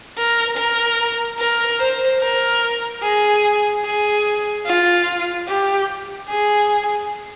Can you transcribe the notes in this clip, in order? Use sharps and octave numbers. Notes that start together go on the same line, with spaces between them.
A#4
A#4
A#4
C5
A#4
G#4
G#4
F4
G4
G#4